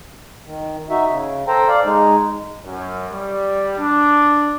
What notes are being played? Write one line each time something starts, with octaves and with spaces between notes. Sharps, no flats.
D#3
D#4 F#4 E5
C#3
A4 C5 G5 A#5
D5 F5
G#3 D#4
F#2
G3
D4